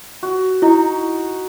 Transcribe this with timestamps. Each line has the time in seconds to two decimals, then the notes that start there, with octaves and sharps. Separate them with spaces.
0.23 F#4
0.62 D#4 E4